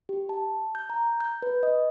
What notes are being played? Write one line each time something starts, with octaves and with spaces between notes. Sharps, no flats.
G4
A5
G6
A#5
G6
B4
D#5